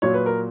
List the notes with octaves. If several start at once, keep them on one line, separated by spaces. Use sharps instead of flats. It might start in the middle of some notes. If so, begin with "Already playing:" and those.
A#2 F#3 C#5
B4
A#4